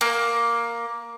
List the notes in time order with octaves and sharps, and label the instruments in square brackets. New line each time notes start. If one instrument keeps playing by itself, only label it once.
[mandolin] A#3